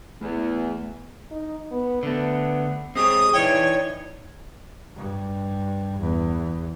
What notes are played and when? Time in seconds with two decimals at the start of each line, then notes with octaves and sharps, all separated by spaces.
0.21 E2 A3
1.31 D#4
1.71 B3
2.03 D3 A3 B3
2.95 G#3 C4 G4 C#5 D#6
3.34 E3 D#4 C#5 D5 G5
4.96 G2
6.00 E2